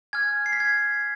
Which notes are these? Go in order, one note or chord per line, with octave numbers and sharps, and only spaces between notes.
G#5 D6 F6 G#6
C7
B6
G#6